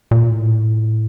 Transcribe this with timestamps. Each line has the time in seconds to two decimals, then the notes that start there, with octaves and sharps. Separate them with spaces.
0.11 A#2
0.30 A2